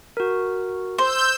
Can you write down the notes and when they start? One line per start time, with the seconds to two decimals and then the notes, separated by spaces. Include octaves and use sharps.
0.17 F#4 A#4
0.98 C5 E6 G6